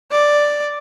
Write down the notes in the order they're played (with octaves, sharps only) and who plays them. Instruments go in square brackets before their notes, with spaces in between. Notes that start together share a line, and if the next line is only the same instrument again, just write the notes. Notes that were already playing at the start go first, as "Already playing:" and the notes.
[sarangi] D5